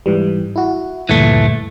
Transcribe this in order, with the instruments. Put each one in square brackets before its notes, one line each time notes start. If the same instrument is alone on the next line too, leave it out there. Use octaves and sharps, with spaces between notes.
[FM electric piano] G#2 E3 G3
E4 F#4
[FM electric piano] D2 G2 A#2 [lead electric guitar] E3 A3